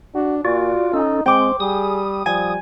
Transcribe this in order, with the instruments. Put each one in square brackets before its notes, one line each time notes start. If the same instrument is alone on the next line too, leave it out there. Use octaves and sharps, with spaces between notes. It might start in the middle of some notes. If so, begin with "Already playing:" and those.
[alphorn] D4 [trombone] F#4
[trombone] A#2 [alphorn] F4 [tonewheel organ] F#4 D5
[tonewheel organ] C#4 A4 [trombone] D#4
[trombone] G#3 [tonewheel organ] C4 [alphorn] C5 [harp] G5 D6
[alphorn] G3 [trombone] G#4 [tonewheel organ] D#6
[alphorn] F3 [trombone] G3 [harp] G#5